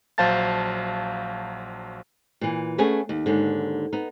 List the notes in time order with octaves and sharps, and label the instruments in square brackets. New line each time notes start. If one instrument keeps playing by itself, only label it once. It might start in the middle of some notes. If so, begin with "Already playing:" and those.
[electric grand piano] A#1 F#3 C5 F5 A5 A6
[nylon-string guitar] A#2 E3
A3 B3 C#4 G#4
D#2
D#2 G#2 D3
B3 D#4